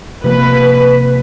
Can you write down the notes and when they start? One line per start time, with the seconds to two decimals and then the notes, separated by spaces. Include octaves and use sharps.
0.24 C3 F3 A#3 B4